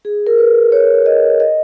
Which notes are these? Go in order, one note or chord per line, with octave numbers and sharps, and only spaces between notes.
G#4
A#4
B4
C#5
D#5
D#5